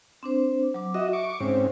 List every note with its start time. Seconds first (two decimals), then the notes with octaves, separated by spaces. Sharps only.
0.23 C4 D4 C5
0.74 F#3 D6
0.94 F#4 D#5 E5
1.13 C#6 D6
1.40 G#2 C4 C#4 C5